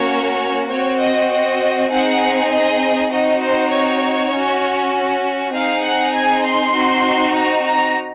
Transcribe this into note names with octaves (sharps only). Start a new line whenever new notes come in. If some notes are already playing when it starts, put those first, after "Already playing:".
Already playing: A#3 C#4 F#4 C#5
C4 F#4 C#5
D#5
D#5
C4 D#4 G#4 F#5
D#5
C4 D#4 F#4 D#5
C5
C#5
C#4 F#4
C4 D#4 G#4 F5
F#5
G#5
C6
C4 D#4 F#4
A#5
A#5